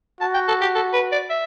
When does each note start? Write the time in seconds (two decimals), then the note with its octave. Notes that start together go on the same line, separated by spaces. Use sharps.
0.21 F#4 A5
0.34 G5
0.48 A4
0.61 G4
0.75 A4
0.93 B4
1.12 D5
1.30 E5